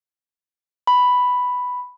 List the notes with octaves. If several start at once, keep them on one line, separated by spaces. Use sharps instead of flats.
B5